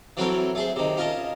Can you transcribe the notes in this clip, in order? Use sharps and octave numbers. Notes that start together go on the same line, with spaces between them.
E3 F#3 C4 A4 A#4 C#5
A3 G#4 C5
C3 D#3
C#4 F4 A#4 D#5 A5